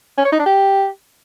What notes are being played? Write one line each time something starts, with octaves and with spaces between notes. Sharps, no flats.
C#4
C#5
D#4
D4
G4